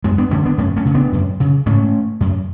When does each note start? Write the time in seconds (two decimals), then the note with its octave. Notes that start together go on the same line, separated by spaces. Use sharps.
0.04 F#2 G#3 B3
0.18 B3 D4
0.31 D3 A3 C#4
0.46 B3 D4
0.58 F#2 A3 C#4
0.76 A3 C#4
0.86 C#3
0.94 B3 D4
1.13 F#2
1.40 C#3
1.66 G#2 A3 C#4
2.21 F#2